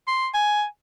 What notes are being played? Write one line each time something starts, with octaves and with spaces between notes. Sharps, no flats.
C6
G#5